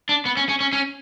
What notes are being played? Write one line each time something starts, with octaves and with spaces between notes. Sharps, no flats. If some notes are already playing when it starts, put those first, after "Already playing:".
D4
B3
C#4
C#4
C#4
C#4